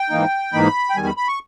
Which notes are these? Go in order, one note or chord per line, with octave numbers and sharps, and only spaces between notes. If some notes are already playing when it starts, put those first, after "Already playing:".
Already playing: G5
G#2 E3 A#3 D#4
G#2 E3 A#3 D#4 B5
G5
E2 D#3 G3 G#5
B5
B5
C#6